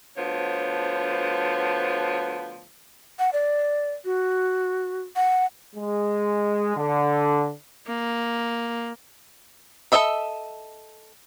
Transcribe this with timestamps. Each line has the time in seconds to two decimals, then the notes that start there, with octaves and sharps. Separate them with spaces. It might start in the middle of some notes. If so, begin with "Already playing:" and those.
0.17 D2 F3 B3 C5 C#5
3.19 F#5
3.33 D5
4.05 F#4
5.16 F#5
5.75 G#3
6.76 D3
7.86 A#3
9.92 A4 B4 D#5 E5 B5